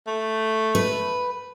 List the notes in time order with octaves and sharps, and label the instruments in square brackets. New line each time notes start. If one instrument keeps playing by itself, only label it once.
[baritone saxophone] A3
[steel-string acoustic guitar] B4